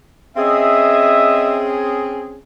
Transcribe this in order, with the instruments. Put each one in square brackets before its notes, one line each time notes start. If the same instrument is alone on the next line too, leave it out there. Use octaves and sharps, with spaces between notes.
[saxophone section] C4 C#4 G#4 [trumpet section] D#5 E5